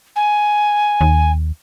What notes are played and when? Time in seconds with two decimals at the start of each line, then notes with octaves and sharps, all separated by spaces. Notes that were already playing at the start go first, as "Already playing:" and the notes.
0.16 G#5
1.01 D#2